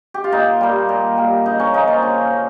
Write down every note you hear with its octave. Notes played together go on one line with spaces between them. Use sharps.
G4
F4
A#2 D#4
G3 A#3
A#2
G3 A#3
C#3 D#4
C#4
F3 A#3 D#4
F4
C#3 C#4
F3 A#3